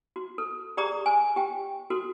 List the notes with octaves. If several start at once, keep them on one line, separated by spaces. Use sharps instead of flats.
F#4
A4
G4 G#4 D5 A#5 D#6
G#5
G4 G5
F#4 A4